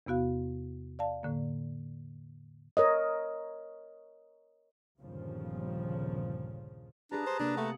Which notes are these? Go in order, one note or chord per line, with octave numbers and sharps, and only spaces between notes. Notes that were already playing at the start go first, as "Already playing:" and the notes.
E2 C3 B3 F#4 F5
D5 F5 A5
A2 D3 A#3
A#4 C#5 D#5
G1 D#2 A#2 C#3 F3
D4 G4 G#4 B4 A5 A#5
C5
C3 A#3 D4
A3 F#5